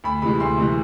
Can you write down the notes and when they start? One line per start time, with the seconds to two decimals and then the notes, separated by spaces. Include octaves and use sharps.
0.04 D2 B5
0.22 C3 E3 G#3 B5
0.40 D2 C6
0.58 C3 E3 G#3